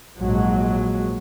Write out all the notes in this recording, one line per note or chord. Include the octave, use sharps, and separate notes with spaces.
A#1 G#2 F#3 G#3